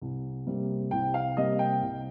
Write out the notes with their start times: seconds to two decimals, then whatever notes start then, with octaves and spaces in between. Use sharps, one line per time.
0.01 C2
0.46 C3 G3 A#3
0.91 C2 G5
1.14 F5
1.36 C3 G3 A#3 D#5
1.59 G5
1.82 C2